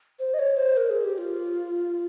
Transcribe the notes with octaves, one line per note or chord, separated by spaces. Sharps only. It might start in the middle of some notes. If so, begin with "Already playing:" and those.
C5
D#5
C#5
C5
A#4
G#4
G4
F4